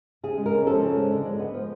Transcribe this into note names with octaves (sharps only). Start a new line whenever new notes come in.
C#3 G#4
G#3
A#4
C#4
F3 A4
C#3
G#3
D3
G#3
B3
F3